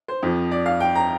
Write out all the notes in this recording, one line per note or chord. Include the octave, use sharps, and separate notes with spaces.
C5
F2 F3
D5
F5
G5
A#5